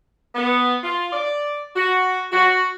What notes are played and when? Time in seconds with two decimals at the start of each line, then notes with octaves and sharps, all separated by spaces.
0.35 B3
0.84 F4
1.13 D5
1.76 F#4
2.32 F#4